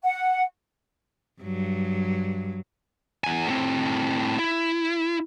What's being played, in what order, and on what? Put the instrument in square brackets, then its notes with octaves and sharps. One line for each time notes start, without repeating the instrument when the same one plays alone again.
[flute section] F#5
[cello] G2 F#3
[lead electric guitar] E2 G#5
A2 C4
E4